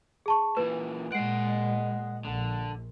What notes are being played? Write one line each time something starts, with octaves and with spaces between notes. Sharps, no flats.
G#4 A5 C#6
A#2 E3 B4
A#2 G#3 D#5 F#5 C7 D7
A#1 D3